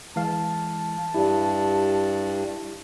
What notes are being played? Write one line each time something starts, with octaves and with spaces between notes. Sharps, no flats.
E3 G#3 F5 A5
G2 E4 G4